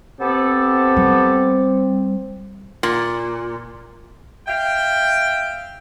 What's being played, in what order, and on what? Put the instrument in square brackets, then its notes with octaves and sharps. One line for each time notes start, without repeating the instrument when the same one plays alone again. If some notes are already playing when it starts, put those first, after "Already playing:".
[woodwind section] B3 G4 A4 [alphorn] C4
[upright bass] G3
[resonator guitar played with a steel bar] A#2
[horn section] E5 F5 G5